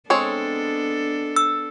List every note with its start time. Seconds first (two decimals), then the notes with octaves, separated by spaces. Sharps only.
0.10 G#3 B3 C4 D4 A4 C#5
1.36 E6